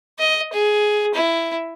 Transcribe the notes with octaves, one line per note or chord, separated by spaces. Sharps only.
D#5
G#4
E4